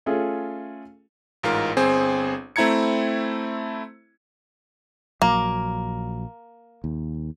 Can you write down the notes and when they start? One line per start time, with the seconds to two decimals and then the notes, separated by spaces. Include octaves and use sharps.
0.06 A3 C#4 F4 G#4
1.43 A1 G#2 F4 A#4
1.77 G1 C4 G#4 C5
2.56 A3 C4 E4 A#5 G#6 C#7
5.22 A#1 F#3 A#3
6.84 D#2